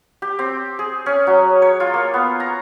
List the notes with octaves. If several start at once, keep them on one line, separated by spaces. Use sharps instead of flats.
G4
C4
G#4
C#4
F#3
C#5
F4
A#3
B3
A#5